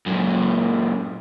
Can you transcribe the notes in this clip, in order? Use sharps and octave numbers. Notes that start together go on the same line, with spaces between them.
F#2 A#2